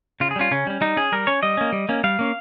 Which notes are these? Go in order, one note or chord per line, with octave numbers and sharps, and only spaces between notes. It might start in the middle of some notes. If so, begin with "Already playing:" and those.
C#3 F4
G#4
G3 C#4 F4
C#3 C#4
G3 C#4
G3 D#4
C#4 G#4
G3 A#4
C#4 C#5
G3 D#5
A#3 C#4
G3
A#3 C#4
G3 F5
A#3 C#4